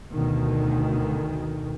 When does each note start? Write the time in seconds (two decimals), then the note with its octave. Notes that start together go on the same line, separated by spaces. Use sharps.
0.11 D2 B2 D#3